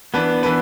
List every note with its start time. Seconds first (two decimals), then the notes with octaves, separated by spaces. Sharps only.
0.14 E3 B3 D4 B4
0.43 E3 D4 B4